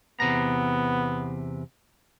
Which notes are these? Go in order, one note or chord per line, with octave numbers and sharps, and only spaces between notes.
E2 C3 B3 A#5